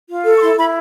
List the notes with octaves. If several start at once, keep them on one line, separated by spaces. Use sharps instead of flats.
F4
A4
C#6
E4 C6
E4 B5